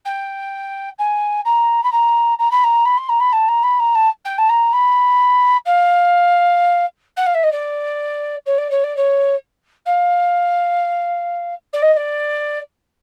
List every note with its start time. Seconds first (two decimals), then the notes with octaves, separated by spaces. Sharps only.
0.05 G5
0.98 G#5
1.45 A#5
1.83 B5
1.92 A#5
2.39 A#5
2.51 B5
2.64 A#5
2.85 B5
2.97 C6
3.09 A#5
3.20 B5
3.32 A5
3.48 A#5
3.63 B5
3.79 A#5
3.95 A5
4.25 G5
4.38 A5
4.49 A#5
4.73 B5
5.66 F5
7.17 F#5
7.26 F5
7.34 E5
7.43 D#5
7.52 D5
8.46 C#5
8.58 D5
8.70 C#5
8.84 D5
8.96 C#5
9.86 F5
11.73 D5
11.82 D#5
11.93 D#5
11.96 D5